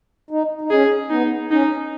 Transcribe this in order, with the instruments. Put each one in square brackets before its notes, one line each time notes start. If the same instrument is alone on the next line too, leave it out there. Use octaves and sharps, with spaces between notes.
[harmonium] D#4
D#4
[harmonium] C#4 [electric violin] G#4
[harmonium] B3 [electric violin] D#4
[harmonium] C#4 [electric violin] D#4